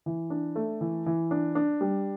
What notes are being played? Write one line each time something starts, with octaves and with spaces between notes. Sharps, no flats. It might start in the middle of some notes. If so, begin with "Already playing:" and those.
E3
D4
A3
E3
E3
D4
D4
G3